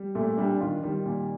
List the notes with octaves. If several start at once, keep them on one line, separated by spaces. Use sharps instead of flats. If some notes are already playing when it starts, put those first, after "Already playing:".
Already playing: G3
A#2 A3
G3 D4
D#3 F4
D#3 G3
A#2